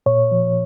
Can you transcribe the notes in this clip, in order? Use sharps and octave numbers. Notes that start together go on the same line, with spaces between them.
A#2 C#5
F3